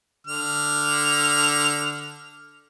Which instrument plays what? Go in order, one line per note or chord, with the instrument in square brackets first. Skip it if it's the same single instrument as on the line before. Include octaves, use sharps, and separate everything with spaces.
[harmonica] D3 F6